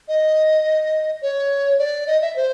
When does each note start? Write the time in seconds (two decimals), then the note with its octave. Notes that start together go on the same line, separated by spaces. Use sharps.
0.08 D#5
1.22 C#5
1.79 D5
2.07 D#5
2.22 E5
2.36 C5